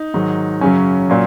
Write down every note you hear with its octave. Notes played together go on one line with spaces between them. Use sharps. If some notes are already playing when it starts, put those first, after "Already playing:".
Already playing: D#4
G#2 D#3 F#3
F#2 C#3 F#3 C#4
A#2 F#3